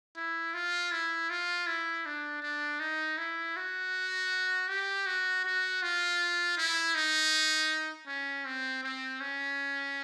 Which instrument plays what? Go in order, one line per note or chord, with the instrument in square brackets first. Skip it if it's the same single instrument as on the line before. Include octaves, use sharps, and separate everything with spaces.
[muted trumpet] E4
F4
E4
F4
E4
D4
D4
D#4
E4
F#4
G4
F#4
F#4
F4
E4
D#4
C#4
C4
C4
C#4